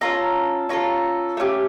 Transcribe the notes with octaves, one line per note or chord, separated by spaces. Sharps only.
C#4 F4 A4 A#5
C#4 F4 A4 A#5
A3 C#4 G4